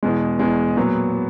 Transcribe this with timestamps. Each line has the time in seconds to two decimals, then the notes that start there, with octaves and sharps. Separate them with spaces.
0.03 E2 B2 G#3
0.39 E2 B2 G#3
0.77 A#2 F#3 B3
1.14 B3